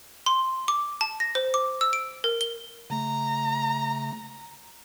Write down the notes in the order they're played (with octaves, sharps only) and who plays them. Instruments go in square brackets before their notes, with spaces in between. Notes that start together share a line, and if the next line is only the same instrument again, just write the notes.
[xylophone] C6
D6
A5
A#6
C5
D6
E6
D7
A#4
G7
[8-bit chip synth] C#3 A3 [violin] A#5